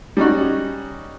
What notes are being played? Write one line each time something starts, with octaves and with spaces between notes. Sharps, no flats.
G3 C#4 D#4 F#4